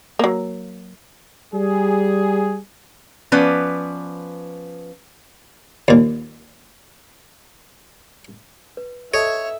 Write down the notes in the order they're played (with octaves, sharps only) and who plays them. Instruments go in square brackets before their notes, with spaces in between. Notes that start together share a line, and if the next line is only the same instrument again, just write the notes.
[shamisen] F#3 A#3
[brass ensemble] G3 G#4
[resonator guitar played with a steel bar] F3 B3 C#4 B4 D5
[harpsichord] D#2 A#2
[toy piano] B4
[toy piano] A4 D#5 A5 [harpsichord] C#5 [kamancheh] E5